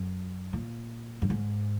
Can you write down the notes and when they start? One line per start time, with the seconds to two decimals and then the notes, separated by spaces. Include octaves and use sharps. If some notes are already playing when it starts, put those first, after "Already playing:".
Already playing: F#2
0.53 A#2
1.22 F#2
1.30 G#2